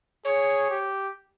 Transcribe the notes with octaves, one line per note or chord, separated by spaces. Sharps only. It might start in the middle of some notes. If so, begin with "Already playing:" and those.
G#4 C#5
G4